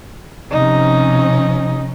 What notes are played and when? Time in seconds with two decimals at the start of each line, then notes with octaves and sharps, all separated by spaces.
0.52 C3 F3 C#4 D#4